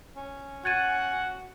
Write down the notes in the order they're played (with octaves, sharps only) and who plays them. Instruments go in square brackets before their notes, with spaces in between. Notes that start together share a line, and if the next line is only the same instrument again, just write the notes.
[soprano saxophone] C#4
[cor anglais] F#4 [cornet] F#5 [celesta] G#6 A6 D#7